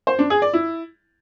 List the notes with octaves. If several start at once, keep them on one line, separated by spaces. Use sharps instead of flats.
C5
D4
G#4
D5
E4